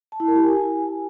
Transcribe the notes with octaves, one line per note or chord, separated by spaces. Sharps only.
A5
E4
A#4
G4
G#5